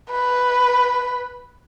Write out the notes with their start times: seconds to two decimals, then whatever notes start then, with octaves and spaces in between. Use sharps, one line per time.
0.11 B4